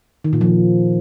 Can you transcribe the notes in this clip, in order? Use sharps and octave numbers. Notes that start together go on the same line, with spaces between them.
D#3
A#2
F3